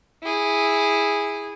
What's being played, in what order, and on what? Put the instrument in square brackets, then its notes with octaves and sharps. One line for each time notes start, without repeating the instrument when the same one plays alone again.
[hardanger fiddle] E4 G#4